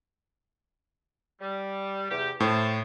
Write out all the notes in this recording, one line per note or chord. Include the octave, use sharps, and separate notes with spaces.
G3
E2 C3 G4
A2 C5 A5